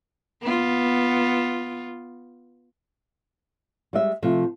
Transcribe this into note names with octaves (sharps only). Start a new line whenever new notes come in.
B3 F4
G3 G#3 E5
C3 F3 A3